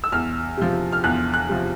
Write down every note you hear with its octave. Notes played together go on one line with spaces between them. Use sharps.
E6
E2 F6
C3 F3
F6
E2 F#6
F#6
C3 F3